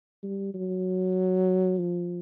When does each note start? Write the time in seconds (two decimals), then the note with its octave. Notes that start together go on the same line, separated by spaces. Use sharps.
0.23 G3
0.54 F#3
1.79 F3